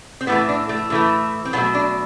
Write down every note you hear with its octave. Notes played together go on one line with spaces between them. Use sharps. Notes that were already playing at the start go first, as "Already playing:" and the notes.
C4
A2 E3 A3 B3
D4
A3
A2 E3 A3
C4
B2 F#3 A3 B3
D4